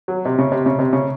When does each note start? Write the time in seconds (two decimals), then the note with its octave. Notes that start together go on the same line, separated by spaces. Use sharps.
0.08 F#3
0.25 C3
0.39 C#3
0.52 C3
0.66 C#3
0.79 C3
0.93 C#3